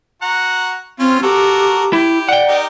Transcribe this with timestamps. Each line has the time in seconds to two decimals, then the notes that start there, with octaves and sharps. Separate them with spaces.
0.22 F#4 F#5 A#5
0.99 C4 C#4 F4
1.23 F#4 G4 A4 A#4
1.93 E4 G4
2.29 D5 F#5 G5
2.48 D#4 G4 A#4